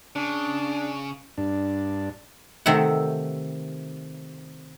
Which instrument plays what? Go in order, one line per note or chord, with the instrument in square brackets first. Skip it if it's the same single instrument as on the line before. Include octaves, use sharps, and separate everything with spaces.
[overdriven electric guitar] C#3 [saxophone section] D4
[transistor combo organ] G2 D4
[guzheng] C3 D#3 A3 E5 F#5